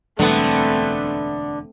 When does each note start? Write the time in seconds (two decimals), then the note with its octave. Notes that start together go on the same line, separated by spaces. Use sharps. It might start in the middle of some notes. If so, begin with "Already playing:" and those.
0.19 E1 D2 D3 G3 A3 B3 C4